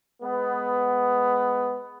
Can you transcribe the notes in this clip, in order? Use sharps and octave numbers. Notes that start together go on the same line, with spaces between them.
G#3 B3